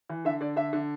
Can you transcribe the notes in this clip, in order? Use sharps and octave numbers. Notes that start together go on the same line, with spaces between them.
E3
D3 E5
D3 D5
D3 E5
D3